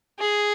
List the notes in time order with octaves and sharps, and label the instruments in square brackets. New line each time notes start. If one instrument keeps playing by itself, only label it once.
[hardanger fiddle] G#4